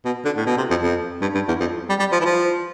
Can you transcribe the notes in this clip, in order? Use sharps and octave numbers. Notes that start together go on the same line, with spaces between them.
B2
D3
A2
B2
C3
F2
F2
G2
G2
E2
F2
G3
G3
F3
E3
F3